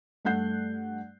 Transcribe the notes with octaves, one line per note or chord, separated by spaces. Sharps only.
G2 A3 F#5 F#6 G6 C7